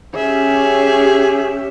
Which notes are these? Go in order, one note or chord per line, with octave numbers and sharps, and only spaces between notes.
C#4 G4 G#4 E5